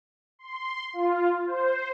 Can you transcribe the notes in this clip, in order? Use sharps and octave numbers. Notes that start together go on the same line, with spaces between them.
C6
F4
C5